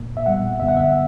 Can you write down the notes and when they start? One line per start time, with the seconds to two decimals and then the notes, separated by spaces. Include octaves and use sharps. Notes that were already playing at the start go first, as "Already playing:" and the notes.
Already playing: A#2 A#3
0.17 E5
0.26 A#2 G3 B3 F#5
0.60 F#2 D3 G3 B3 E5
0.68 F#5
0.77 E5